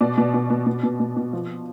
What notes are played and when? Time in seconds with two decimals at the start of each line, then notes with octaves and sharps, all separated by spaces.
0.01 B2 D5
0.18 B2
0.34 B2
0.50 B2
0.67 B2
0.83 B2
1.00 B2
1.17 B2
1.33 F3